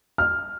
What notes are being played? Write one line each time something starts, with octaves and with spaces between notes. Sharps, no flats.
F6